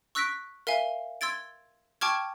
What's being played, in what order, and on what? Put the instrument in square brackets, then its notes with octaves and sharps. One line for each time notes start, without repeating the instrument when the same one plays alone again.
[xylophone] C#6 E6 F#6 A#6 B6 D7
A#4 E5 F5 G#5
C6 E6 G#6 A6 D7
G5 A5 C#6 D6 F6 G#6